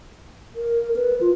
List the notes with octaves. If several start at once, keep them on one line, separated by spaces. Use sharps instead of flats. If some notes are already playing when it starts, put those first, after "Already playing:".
A#4
B4
F4